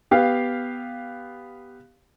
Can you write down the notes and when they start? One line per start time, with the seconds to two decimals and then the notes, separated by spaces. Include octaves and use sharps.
0.11 B3 G4 F5